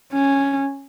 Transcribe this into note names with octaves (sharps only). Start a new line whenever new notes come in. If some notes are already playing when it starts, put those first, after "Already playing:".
C#4